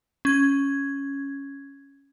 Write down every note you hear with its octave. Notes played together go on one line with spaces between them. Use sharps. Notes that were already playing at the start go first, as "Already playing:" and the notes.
C#4 G#6